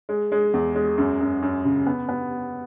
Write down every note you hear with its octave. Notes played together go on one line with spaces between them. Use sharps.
G#3
G#3
E2
G#3
F#2
F#2
F#2
C#3
B3
B3